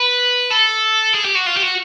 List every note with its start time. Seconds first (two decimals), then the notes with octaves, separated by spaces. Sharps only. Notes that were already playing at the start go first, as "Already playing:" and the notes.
Already playing: B4
0.51 A4
1.14 G#4
1.25 G4
1.35 F#4
1.46 F4
1.57 G4
1.62 F#4